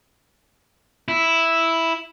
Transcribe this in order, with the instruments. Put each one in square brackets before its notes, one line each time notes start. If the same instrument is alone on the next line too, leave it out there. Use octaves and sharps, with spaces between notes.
[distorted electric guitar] E4